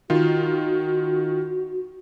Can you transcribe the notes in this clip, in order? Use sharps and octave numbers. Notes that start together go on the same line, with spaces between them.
D#3 F4 F#4